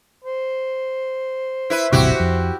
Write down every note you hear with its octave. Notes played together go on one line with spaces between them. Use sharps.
C5
E4 B4
D#1 A1 C3 E4 F#4 G4
F2